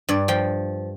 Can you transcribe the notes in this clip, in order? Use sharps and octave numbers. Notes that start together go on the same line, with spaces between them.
G2 D5
F3 G5